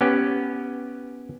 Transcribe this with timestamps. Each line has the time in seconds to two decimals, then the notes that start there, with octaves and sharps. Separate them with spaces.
0.01 B3 C#4 G4